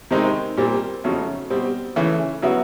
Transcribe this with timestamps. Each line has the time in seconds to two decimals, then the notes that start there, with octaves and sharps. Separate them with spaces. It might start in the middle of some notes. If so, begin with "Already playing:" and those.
0.11 C3 D#3 G#3 C4 D#4
0.57 A#2 G3 C4
1.04 F2 C#3 F#3 A3 C#4
1.50 B2 G3 C4
1.96 C#3 E3 A3
2.42 C#3 F#3 B3 E4